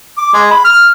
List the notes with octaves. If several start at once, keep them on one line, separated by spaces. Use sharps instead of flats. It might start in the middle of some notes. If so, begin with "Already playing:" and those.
D6
G#3
B5
F6